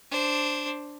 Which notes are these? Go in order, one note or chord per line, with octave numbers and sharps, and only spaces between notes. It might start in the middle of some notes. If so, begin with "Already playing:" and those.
D4 C5